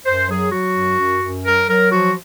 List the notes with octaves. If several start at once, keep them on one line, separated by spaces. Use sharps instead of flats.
F#2 C5
F#3 G#4
F#3 F#4
F#2
F#2
F#2
F#3 A#4
F#3 A#4
F3 F#4